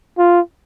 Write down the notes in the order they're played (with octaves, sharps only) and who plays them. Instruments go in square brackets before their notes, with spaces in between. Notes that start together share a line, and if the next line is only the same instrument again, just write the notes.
[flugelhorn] F4